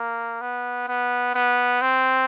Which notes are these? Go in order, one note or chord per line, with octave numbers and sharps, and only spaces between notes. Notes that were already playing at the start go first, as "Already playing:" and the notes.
Already playing: A#3
B3
B3
B3
C4